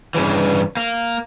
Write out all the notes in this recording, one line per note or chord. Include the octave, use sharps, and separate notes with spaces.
G2 C#3 E3
A#3